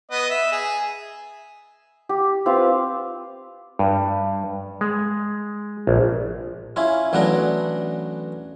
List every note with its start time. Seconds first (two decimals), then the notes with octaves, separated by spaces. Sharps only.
0.11 B3 D#5
0.30 E5
0.52 G#4
2.09 G4
2.46 C4 F4 B4 F5
3.79 G2
4.81 G#3
5.87 A#1
6.76 C#4 E4 F4
7.13 A1 F#3 B3 D4 A#5